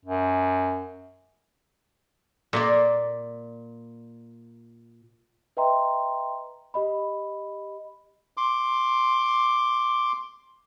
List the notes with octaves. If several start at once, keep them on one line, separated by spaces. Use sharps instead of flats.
F#2
A#2 A#3 D5
B4 D#5 E5 G5 A#5 C6
G4 D#5 B5
C6 D6